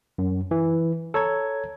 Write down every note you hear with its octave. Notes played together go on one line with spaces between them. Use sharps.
F#2
E3
A4 C#5 A#5 G#6